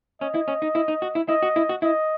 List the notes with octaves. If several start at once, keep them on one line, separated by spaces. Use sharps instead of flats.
C#4 D#5
E4
C#4
D#4
E4
D#4
F#4
E4
E4 D#5
F#4
E4
F#4
E4 D#5